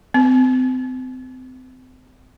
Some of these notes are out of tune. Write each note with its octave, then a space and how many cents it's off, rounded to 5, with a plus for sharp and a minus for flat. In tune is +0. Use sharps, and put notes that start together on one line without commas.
C4 -35